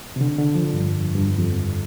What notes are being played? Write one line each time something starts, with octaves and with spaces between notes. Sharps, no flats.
C3
D3
D3
F3
G2
F2
G2
F2